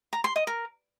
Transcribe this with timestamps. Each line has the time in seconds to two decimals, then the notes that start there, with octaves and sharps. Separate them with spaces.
0.13 A#5
0.24 C6
0.36 D#5
0.47 A#4